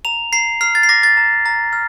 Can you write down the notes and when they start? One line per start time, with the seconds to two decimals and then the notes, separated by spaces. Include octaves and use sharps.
0.05 A#5 F7
0.33 A#5 C7
0.61 F6 C7
0.75 A6
0.83 C7
0.89 D6 A#6
1.03 A6
1.17 A#5
1.46 A#5
1.73 F6